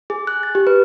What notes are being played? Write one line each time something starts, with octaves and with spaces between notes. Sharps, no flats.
G#4
F#6
A6
G4
B4